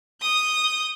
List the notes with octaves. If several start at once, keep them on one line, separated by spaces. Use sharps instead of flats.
D#6 G6